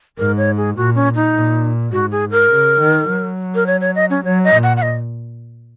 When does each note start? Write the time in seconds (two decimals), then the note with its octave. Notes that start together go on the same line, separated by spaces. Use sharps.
0.18 G#2 A#4
0.37 C#5
0.57 G#4
0.76 A#2 F#4
0.95 C#4
1.15 D#4
1.35 A#2
1.92 G#2 F#4
2.11 G#4
2.31 A#4
2.50 C#3
2.79 D#3
3.09 F#3
3.55 A#4
3.67 C#5
3.81 C#5
3.95 D#5
4.10 C#4
4.25 F#3 C#5
4.44 D#5
4.54 A#2
4.63 F#5
4.77 F#5
4.82 D#5